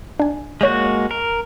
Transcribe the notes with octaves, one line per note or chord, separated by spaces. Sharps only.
D4 G#5
G#3 A#3 F#4 C#5 G6 A#6
A#4